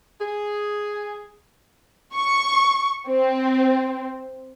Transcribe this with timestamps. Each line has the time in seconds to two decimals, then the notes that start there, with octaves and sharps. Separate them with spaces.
0.21 G#4
2.15 C#6
3.08 C4